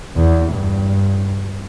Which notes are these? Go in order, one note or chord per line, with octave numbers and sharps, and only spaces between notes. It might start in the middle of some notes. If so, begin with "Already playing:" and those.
E2
G2